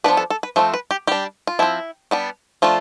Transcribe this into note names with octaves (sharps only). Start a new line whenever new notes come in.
F3 B3 D4 B4
A4
A4
B4
F3 A3 C4
B4
G4
G3 D4 G4
F4
F3 C4 E4
G3 B3 D4
F3 A3 D4 F4